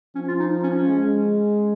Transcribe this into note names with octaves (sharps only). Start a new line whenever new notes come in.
F3 C#4
F4
D#4
C#4
C#4
G#3